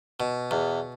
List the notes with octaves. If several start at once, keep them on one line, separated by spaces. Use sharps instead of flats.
B2
E2